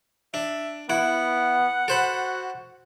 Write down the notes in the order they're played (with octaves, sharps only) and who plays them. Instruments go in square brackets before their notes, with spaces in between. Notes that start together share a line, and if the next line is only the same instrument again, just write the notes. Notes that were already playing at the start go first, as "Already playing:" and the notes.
[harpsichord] D4 [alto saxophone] E5
[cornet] B3 [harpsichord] E4 [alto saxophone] F#5
[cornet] F#4 [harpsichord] A4 C5 B5